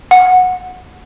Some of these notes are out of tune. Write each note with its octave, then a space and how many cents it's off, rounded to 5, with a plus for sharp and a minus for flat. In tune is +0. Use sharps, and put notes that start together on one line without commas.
F#5 -15